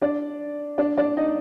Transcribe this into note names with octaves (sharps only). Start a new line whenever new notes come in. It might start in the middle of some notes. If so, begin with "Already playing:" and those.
D4 D5
D4 D5
D4 D5
D#4 D#5